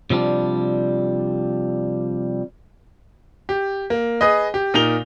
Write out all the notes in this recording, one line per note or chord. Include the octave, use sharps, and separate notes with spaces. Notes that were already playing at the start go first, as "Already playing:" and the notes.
C3 F3 G3 D4
G4
A#3
G#4 B4 D#5
G4
A#2 D#4 A#4 F7 G7